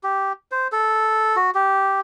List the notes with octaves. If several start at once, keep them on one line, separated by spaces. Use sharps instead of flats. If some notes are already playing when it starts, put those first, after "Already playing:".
G4
C5
A4
F#4
G4